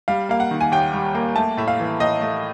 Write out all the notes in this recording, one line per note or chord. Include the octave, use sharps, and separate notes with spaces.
G3 F5
A#3 F5
F#5
D#3
G#5
D#2 G5
G3
A#3
A3 A5
A2 E5
F5
E3
A2 D#5
A3